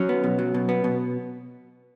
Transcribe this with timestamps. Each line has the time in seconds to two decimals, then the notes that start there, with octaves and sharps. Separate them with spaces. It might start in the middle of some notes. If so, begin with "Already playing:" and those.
Already playing: F#3 C#4
0.09 B3
0.24 B2
0.39 F#3
0.54 B2
0.69 B3
0.84 B2